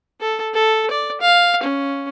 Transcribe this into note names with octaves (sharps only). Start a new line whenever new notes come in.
A4
A4
D5
F5
C#4